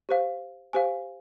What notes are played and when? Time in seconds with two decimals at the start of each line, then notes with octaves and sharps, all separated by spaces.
0.09 G4 C5 F5
0.73 G4 C5 F5 G#5